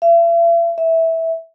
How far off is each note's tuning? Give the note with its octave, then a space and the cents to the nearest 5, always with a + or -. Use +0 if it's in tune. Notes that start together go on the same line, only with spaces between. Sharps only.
E5 +45
E5 -10